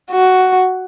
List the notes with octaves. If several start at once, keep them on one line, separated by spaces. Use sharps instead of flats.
F#4